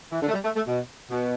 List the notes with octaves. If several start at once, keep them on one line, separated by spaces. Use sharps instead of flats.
E3
D3
A3
G3
A3
A3
B2
B2